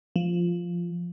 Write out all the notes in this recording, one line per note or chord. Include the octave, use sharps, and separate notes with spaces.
F3